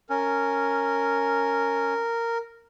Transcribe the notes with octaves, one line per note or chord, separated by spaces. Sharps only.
C#4 A#4